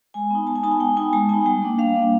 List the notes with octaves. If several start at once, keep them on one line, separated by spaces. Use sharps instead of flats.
G#3 G#5
B3 D#4
G#3 A5
G#5
B3 D#4 A5
G#5
G#3 G5
B3 D#4 G#5
G#3 A5
B3 D#4 G#5
G3 G5
A#3 D4
G3 F5
A#3 D4